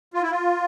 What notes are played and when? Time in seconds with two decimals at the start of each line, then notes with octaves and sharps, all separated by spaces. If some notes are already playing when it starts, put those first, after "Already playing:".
0.14 F4
0.22 E4
0.31 F4